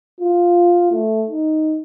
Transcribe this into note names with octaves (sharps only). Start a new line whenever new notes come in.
F4
A3
D#4